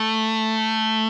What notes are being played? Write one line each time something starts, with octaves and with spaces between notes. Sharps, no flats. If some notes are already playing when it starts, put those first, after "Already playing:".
Already playing: A3